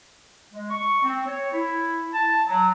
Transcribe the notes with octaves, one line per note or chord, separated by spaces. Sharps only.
G#3
C#6
C4
C#5
E4
A5
F#3